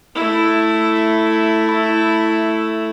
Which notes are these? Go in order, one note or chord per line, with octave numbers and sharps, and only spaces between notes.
A3 E4